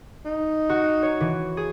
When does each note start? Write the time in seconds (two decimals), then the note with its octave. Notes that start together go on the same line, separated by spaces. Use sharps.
0.25 D#4
0.69 F#4
1.03 C#5
1.20 E3
1.57 G#4